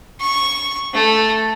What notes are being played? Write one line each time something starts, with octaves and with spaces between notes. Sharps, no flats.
C#6
A3